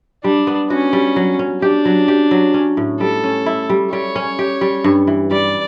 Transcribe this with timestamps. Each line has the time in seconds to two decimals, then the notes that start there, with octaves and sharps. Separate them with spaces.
0.24 G3 D4
0.47 B3
0.70 C#4 F#4
0.93 G3
1.16 F#3
1.39 C#4
1.62 D4 G4
1.85 F#3
2.08 G4
2.31 F#3
2.54 C#4
2.77 A2
3.00 G3 A4
3.24 C#4
3.46 E4
3.69 G3
3.93 G3 C#5
4.16 C#4
4.39 G4
4.61 G3
4.84 G2
5.07 E3
5.31 G3 D5